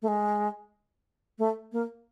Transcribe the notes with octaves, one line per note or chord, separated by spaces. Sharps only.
A3
G#3
A3
A#3